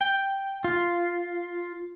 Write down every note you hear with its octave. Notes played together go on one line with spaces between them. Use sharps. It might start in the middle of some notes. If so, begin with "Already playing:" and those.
G5
F4